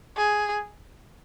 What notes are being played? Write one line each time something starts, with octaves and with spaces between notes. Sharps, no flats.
G#4